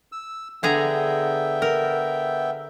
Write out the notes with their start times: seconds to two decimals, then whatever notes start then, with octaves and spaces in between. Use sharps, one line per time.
0.12 E6
0.63 D3 B3 G#4 E5 G5 A#5
1.62 A#4